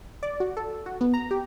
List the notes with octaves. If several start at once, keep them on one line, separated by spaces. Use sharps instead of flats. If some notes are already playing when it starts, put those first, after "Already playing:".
D5
F#4
A4
F#4
B3
A#5
G4